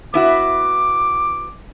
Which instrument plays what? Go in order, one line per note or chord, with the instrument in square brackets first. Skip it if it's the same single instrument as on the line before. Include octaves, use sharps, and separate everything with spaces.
[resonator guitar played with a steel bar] B3 E4 F#4 [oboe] D6